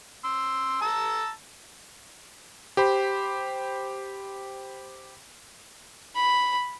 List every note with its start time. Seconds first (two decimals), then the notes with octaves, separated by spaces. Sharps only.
0.24 C6 E6
0.82 A5 A#5 E6
2.77 G4 C5 B5
6.16 B5